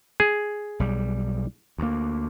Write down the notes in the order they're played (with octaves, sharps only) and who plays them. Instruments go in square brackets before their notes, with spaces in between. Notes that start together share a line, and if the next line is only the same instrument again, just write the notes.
[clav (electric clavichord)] G#4
[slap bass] B1 G3
D2 A#3